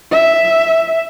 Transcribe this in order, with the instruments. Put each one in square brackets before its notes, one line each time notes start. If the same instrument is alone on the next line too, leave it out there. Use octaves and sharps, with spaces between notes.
[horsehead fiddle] E5